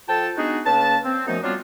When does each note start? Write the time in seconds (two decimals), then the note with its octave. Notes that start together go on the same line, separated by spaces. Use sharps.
0.09 F3 F4 A4 G5 A5
0.37 G#3 B3 D4 D#4 F#4 G#4
0.66 C#3 A#3 B4 A5
1.05 C4
1.27 F#2 F3 A3 B3 D#4
1.43 F#3 G3 B3 C4 D4 F4